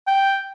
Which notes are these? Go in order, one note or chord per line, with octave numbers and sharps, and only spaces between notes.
G5